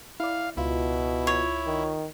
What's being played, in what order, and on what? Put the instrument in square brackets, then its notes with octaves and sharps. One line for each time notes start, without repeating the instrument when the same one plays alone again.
[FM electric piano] E4 D5 [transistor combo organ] F5
[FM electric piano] C#2 F4 [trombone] B2 [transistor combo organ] E4
[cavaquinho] C#5
[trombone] D#3